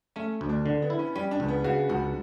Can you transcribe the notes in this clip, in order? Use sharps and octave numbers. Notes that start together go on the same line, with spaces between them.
A3 C#4
D2
D4
D3 D4
B3
E4
C#4
G3 C#4
D4
C#2
B3
C#3 F#4
C#2 F#4